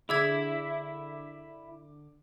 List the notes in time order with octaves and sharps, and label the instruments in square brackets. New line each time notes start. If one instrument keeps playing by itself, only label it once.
[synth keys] D3 D6 [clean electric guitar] E4 E5 [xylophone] G#4 E6 G#6